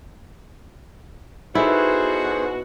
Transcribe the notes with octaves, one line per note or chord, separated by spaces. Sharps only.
B2 D#4 E4 F#4 G#4 A4 B4 C5